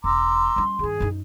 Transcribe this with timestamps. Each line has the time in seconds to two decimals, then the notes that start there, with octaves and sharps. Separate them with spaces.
0.04 E1 A#5 C6 D6 E6
0.56 G3 C#4
0.79 G2 D#3 G#4
1.00 F#2 D#4